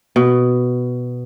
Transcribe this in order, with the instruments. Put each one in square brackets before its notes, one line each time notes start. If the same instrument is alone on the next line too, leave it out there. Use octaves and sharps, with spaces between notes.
[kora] B2